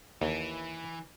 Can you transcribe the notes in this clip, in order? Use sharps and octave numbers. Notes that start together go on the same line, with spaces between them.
D#2 E3